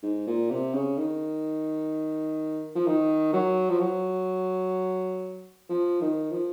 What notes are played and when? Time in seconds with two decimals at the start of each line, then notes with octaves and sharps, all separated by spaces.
0.03 G#2
0.27 A#2
0.51 C3
0.74 C#3
0.98 D#3
2.75 F3
2.87 D#3
3.33 F#3
3.70 F3
3.80 F#3
5.69 F3
6.01 D#3
6.32 F3